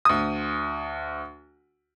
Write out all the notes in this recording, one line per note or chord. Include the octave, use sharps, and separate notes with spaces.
D2 D#6